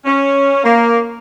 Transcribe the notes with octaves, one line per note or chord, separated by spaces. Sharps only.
C#4
A#3